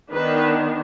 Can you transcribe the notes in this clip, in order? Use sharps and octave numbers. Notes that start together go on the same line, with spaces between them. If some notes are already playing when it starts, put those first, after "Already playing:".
D#3 B3 D4 B4